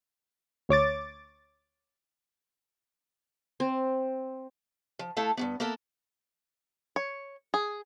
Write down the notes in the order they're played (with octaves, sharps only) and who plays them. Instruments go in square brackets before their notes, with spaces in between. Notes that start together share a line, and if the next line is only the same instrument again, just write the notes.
[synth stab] D2 C#5 D6 A6
[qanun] C4
[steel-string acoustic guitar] F3
A3 E4 A4 F5 A5
G2 D#3 B3
A#3 B3 E4 A4 A#4
[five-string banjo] C#5
G#4